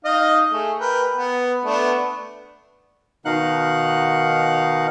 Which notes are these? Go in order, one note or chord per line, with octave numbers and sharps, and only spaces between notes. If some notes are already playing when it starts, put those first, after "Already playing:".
D#4 D#5 F5
A3 G#4
A#4 B4 G5
B3
A3 B3 D4
B2 D#3 D#4 F5 F#5 F#6